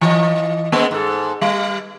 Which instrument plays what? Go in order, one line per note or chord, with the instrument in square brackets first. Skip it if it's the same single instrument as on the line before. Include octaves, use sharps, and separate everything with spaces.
[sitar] E3 D#5
G#3 A#3 B3
G#2 A4
G3